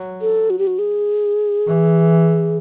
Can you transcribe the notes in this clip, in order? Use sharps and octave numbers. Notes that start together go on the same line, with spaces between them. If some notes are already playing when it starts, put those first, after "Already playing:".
Already playing: F#3
A4
F#4
G4
F#4
G#4
E3